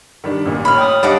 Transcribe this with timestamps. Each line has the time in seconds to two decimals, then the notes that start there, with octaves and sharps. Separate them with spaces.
0.24 D#3 G3 D4
0.46 A1 A#2
0.65 C#5 B5 F6
0.78 G5 D#6
1.03 G3 D4 D5 D#5 F5 F#5 A5 D6